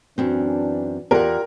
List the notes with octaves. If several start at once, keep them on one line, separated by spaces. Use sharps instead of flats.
F#2 E3 C4 D4
E2 F4 G4 A#4 D5 F#5